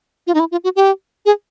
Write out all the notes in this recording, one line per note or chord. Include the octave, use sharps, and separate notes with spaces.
F4
D#4
E4
F4
F#4
G4
G#4